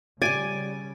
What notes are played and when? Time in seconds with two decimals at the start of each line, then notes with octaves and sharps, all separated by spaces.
0.22 C#3 G3 G4 D5 G#5 A6 D7